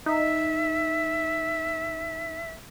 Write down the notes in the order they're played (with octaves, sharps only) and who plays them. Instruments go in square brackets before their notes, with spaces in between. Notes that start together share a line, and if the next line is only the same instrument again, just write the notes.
[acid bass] D#4 [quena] E5